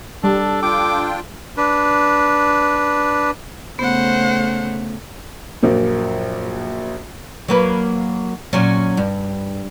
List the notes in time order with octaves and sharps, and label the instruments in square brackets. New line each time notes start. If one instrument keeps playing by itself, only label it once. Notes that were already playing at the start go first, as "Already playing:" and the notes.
[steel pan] G3 [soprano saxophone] D4 [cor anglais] A4
[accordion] D4 F4 G5 [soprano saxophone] D6
[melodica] D4 B4
[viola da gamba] C#3 A3 [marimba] B3 [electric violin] C5 F#5
[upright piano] A#1 F#2 A#3
[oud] F#3 A#3 B4
A#2 F#3 C#4
G2